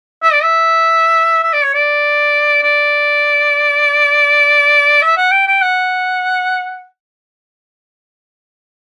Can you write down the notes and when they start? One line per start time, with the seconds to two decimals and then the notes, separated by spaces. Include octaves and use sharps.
0.23 E5
0.33 D5
0.43 E5
1.43 E5
1.53 D5
1.63 C#5
1.74 D5
2.63 D5
5.03 E5
5.17 F#5
5.32 G5
5.47 G5
5.62 F#5